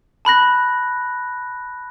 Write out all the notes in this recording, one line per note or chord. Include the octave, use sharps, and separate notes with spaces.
A5 B5 F#6 A#6